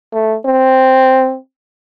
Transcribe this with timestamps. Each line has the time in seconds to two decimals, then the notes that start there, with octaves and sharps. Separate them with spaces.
0.13 A3
0.46 C4